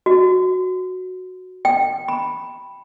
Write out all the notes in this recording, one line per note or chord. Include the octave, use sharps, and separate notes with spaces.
F#4
G5
B5